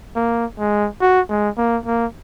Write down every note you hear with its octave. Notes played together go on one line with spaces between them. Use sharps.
A#3
G#3
F#4
G#3
A#3
A#3